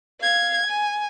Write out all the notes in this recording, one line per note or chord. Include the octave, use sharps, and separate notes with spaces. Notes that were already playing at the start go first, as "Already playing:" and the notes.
F5 G#6
G#5